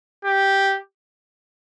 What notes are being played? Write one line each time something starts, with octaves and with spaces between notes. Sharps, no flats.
G4